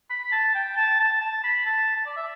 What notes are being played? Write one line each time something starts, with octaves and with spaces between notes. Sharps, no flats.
B5
A5
G5
A5
A5
A5
B5
A5
A5
D5
E5